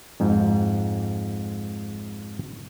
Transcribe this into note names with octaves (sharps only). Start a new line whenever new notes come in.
F2 G#2